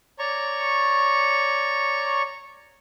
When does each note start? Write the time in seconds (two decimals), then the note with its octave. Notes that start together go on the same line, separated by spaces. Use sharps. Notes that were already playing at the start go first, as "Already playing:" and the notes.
0.19 C#5 D5 A#5 C#6